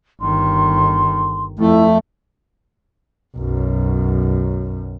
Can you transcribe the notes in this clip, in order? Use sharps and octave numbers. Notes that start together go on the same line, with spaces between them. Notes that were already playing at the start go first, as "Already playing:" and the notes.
G1 D#3 C6
F2 A3 E4
B1 F#2